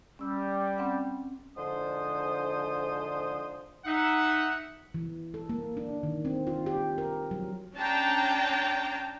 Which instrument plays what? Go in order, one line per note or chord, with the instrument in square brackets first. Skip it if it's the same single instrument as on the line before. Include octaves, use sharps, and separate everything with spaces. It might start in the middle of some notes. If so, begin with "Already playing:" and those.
[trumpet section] G3 [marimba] C#4 E6
[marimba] C4 C#4 F#5
[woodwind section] G#2 D3 F3 C5 D#6
[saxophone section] D#4 [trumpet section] E5 F#5
[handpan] E3
A4
A#3
D4
D#3
C4
F4
G4
A#4
F#3
[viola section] C#4 D4 G5 A5 A#5